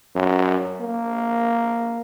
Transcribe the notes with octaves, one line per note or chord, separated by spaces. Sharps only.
F#2
A#3